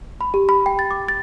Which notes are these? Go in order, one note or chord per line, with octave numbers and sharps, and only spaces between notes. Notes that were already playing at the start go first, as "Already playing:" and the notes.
B5
G4
B5
G5
A6
D6
A6